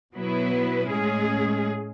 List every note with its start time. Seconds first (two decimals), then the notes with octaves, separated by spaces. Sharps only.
0.15 B2 F#3 B3 E4 B4
0.90 A2 G#3 C#4 G#4